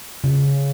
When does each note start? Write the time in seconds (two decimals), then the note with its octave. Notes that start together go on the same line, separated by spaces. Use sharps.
0.24 C#3